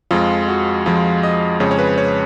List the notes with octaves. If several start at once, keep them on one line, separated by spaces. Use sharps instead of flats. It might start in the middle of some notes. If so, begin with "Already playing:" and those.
F2 F3 G#3 F4
F#4
F2 F3 G#3 F4
D#5
F2 C#3 G#3 C#5
C#5
B4
C#5